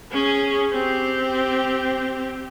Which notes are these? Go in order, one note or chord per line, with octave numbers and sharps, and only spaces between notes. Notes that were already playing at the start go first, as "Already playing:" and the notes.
C#4 G#4
C4 G4